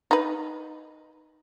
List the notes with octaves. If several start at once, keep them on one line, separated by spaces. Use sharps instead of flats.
D#4 B4